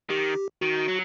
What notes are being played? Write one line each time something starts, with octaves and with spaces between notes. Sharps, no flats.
D#3 G4
D#3 F#4
F#3